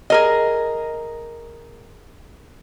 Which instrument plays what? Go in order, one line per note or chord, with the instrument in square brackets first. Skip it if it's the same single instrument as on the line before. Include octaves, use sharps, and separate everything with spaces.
[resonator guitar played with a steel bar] G#4 A#4 D#5